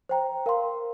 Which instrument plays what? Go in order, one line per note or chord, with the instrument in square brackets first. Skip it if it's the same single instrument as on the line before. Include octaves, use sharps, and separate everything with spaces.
[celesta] C5 G5 A#5
A#4 F5 C6